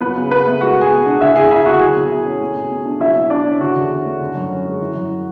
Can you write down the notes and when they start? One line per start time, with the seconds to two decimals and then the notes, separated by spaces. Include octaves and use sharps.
0.01 F#3 B3 B4
0.16 C#3
0.31 C#3 B3 B4
0.46 A3
0.61 G#3 F#4 F#5
0.77 B2 G#4 G#5
0.92 B2
1.06 D4
1.21 D3 E4 E5
1.35 D2 G#4 G#5
1.51 D2 E4 E5
1.66 A3 F#4 F#5
1.81 F#3 G#4 G#5
1.96 B2
2.11 E4
2.25 C#4
2.41 A3
2.55 B2
2.70 B2
2.86 D4
3.00 F#3 E4 E5
3.16 B2
3.30 D4 E4 D5
3.45 C#4
3.60 D3 F#4
3.76 E2
3.91 C#4
4.05 A3
4.20 D3
4.35 F#2
4.50 C#4
4.65 G#3
4.81 E3
4.95 F#2